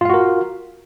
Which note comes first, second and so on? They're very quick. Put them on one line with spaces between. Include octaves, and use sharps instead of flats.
F4 F5 F#4 A#4